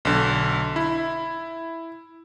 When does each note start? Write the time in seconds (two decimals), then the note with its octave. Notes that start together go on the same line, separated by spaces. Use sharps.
0.05 B1 D3
0.76 E4